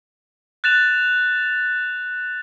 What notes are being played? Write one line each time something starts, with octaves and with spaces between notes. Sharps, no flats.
F#6 A6 E7 F7